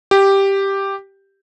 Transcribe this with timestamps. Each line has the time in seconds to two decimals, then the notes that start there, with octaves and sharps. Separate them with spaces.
0.11 G4